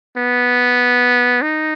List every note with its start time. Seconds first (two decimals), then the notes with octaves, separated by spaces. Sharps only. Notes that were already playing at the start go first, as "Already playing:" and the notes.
0.17 B3
1.42 D#4